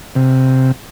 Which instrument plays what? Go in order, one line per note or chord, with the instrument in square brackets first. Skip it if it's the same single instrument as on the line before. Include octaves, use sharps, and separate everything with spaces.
[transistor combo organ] C3